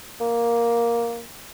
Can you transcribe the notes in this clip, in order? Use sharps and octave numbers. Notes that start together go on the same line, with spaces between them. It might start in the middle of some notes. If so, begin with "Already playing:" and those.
A#3